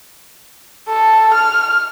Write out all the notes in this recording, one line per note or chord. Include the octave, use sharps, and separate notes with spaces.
A4
F6